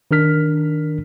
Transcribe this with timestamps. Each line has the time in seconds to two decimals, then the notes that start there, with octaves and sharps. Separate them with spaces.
0.11 D#3 D4 A#4 F6 B6